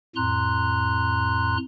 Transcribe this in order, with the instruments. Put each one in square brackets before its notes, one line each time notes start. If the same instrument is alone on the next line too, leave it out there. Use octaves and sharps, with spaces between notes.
[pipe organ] F2 A2 A#5 C6 F#6